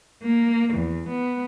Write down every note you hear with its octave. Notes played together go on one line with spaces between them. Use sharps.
A#3
E2
B3